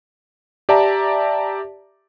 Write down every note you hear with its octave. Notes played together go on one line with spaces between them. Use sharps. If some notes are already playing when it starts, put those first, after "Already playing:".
G4 D5 E5 A5 A#5